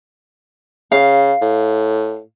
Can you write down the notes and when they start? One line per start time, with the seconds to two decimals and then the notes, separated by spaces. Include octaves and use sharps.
0.92 C#3 F5
1.41 A2